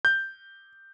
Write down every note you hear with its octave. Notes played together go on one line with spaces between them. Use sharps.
G6